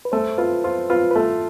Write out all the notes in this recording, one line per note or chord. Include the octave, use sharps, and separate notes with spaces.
B4
A3 C5
F4 B4
F4 C5
F4 B4
B4
A3 A4